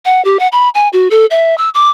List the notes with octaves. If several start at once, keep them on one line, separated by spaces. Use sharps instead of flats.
F#5
G4
F#5
B5
G#5
F#4
A4
E5
E6
D6